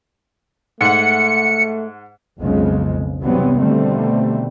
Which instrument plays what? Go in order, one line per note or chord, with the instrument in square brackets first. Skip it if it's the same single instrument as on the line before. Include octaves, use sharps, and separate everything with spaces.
[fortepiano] G#2 F#5 [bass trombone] A3 [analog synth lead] C#7
[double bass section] B1 F2 C#3 G#3
E2 G2 C3 F#3 B3 C4
B2 D3 D#3 G3 A3 C4